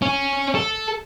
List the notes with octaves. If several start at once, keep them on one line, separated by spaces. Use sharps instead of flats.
C#4
A4